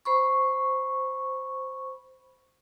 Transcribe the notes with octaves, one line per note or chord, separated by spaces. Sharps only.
C5 B5 C#6